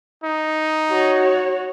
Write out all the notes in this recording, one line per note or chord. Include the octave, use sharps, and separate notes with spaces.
D#4
F#4 C#5